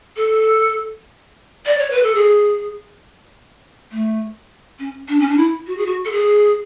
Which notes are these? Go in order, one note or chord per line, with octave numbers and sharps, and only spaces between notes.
A4
D5
C#5
B4
A4
G#4
A3
C#4
D4
C#4
D4
E4
F#4
G#4
F#4
A4
G#4